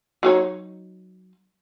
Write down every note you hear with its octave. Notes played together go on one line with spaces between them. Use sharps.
F#3 D#4 C#5